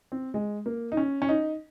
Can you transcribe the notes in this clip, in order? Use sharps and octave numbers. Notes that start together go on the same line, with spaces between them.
C4
G#3
A#3
D#4
C#4
C#4
D#4